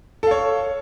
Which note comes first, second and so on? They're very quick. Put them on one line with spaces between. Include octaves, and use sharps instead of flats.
A4 F5 C#5